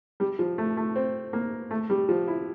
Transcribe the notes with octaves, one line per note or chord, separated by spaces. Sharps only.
G3
F3
A3
A3
C4
A#3
A3
G3
F3
E4